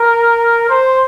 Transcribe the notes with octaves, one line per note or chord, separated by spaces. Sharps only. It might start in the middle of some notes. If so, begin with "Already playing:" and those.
Already playing: A#4
C5